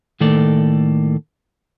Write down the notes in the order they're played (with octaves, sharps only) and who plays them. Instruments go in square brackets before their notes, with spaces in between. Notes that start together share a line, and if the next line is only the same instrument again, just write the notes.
[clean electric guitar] A2 D#3 A3 A#3 A4 D5